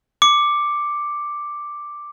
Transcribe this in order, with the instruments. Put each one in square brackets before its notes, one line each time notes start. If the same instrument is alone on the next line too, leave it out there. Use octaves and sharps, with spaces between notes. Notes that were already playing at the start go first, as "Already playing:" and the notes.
[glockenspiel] D6 C#7